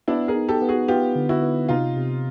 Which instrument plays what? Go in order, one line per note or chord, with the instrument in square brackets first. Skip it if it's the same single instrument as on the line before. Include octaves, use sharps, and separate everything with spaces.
[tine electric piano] B3 [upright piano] D4 E4
[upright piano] G#4 A#4
[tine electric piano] D#4
[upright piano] G4 A4
[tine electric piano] B3
[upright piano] F#4 G#4
[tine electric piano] B3 [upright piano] F4 G4
[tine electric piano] D3
[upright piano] E4 F#4
[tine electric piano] B3
[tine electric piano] C3 [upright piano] D#4 F4
[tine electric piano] C3